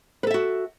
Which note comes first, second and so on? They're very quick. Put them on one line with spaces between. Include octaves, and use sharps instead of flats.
B4 A4 E5 F#4